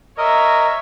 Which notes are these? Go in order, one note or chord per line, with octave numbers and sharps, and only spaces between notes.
A#4 C#5 D#5 E5